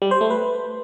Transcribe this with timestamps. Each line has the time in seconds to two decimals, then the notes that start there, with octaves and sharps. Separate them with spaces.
0.02 G3
0.11 C5
0.21 A3
0.30 B4